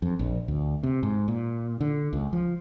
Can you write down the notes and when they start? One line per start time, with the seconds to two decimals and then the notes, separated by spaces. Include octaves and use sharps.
0.02 F2
0.19 A#1
0.48 D2
0.83 C3
1.03 G#2
1.28 A#2
1.81 D3
2.13 C#2
2.33 F3